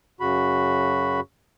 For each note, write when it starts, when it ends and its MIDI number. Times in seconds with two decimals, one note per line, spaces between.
0.21 1.20 42
0.21 1.20 49
0.21 1.20 66
0.21 1.20 83